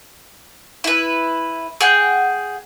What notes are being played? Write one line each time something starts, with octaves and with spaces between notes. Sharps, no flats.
E4 B4
G#4 F#5 G5